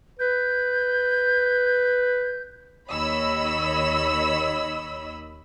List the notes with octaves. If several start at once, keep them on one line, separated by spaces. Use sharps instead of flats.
B4 G6
D#2 D#3 C#5 D#5 B5 E6